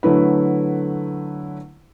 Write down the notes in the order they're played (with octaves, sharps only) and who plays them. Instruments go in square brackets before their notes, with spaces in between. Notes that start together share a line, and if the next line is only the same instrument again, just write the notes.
[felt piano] D3 F#3 A3 E4 B4